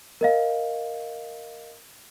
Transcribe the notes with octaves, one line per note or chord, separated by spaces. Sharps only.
A#4 D#5 F5